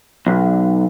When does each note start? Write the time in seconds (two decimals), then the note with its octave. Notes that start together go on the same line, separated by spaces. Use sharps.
0.27 B1